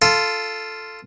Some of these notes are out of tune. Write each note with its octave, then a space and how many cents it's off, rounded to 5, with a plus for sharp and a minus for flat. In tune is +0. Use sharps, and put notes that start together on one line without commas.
F4 -5 A4 +0